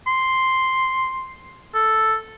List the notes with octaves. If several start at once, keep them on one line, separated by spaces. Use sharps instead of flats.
C6
A4